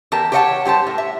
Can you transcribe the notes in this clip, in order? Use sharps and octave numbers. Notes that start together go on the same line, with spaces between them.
E2 G4 A#4 A5
G4 G#4 C#5 D#5 F#5 A5
G2 G4 C5 A5
A2
E5